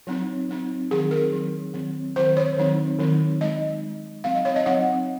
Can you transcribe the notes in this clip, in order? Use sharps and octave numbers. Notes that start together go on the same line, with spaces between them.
F#3 C4 D#4
F#3 C4 D#4
D#3 F#3 C4 D#4 G#4
A#4
D#3 F#3 C4 D#4
D#3 F#3 C4
D#3 F#3 C4 C5
C#5
D#3 F#3 C4 D#4
D#3 F#3 C4 D#4
G#3 D#4 D#5
G#3 D#4
F#3 C4 D#4 F5
D#5
C#5
D#5
F#3 C4 D#4 F#5